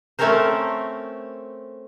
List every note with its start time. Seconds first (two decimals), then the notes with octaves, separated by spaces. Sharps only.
0.19 A3 C4 C#4 A4 A#4 C5